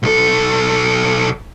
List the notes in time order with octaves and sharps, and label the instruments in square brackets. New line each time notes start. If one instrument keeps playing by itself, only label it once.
[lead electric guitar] B1 A4